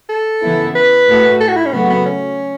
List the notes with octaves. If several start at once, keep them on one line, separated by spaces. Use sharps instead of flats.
A4
C#3 E3 B3 E4
B4
A2 A3 F#4 A4
A4
F#4
E4
C#4
C#3 F#3 A3 B3 F#4
B3
C#4